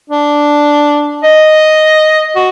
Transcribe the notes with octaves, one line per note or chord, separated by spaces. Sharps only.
D4
D#5
F#4